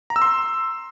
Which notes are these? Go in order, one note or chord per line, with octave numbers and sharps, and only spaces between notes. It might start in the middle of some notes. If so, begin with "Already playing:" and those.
A#5
E6
C6